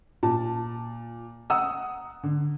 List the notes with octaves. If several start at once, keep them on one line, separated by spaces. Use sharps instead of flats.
A#2 A5
F#5 A#5 D#6 E6
D3